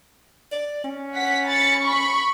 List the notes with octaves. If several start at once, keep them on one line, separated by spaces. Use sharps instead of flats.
D5
C#4
F#5 B6
B5 A6 C#7
B5 C#6